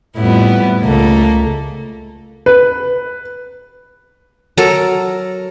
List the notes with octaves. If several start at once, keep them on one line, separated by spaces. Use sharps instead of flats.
F2 A2 G3 B3 E4
C#2 A3 A#3 A4
B4
F#3 A4 A#4